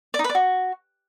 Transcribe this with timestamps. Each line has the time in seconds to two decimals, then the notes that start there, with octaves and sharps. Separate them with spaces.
0.14 D5
0.19 D#4
0.24 B4
0.29 D5
0.35 F#4